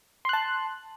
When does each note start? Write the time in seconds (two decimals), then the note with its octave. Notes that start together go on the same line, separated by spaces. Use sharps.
0.25 C6
0.29 F#6
0.33 A5